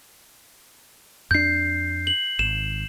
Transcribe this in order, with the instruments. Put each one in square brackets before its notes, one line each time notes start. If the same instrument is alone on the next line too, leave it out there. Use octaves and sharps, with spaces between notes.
[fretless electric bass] F2 D4 [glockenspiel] G6 C7
[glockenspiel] F#7
[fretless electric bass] G#1 [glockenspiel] E7